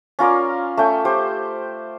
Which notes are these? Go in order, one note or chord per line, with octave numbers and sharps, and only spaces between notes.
C#4 F4 A#4 D5
A3 C#4 G5
G4 C5